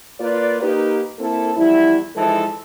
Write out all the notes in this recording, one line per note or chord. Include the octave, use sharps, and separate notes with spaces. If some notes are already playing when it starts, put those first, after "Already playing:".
A#3 F4 B4 D5
A#3 D#4 G4 B4
A#3 C4 E4 A4
E2 F3 G3 E4
E3 F3 G#3 D#4 A4